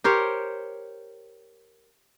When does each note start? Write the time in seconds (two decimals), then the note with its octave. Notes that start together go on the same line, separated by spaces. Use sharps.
0.04 G4 A#4 C5 C#5